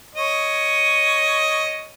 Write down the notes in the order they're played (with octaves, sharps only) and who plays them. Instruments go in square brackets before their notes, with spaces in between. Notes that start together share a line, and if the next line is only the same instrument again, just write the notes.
[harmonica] C#5 D#5